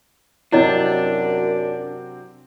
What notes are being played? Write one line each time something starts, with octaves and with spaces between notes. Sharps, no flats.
F#2 C3 F#3 C4 D4 E4 C#5 D#5